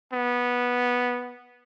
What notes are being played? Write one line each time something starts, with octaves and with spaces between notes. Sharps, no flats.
B3